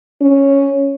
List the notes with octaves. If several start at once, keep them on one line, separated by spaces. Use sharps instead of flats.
C#4